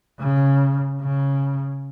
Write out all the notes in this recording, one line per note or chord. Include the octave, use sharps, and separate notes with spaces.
C#3
C#3